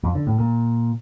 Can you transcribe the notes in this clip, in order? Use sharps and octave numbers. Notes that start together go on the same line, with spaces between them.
F2
D3
A2
A#2